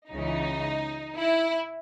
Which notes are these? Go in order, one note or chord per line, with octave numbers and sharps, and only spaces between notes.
C#2 C#3 E3 D#4
E4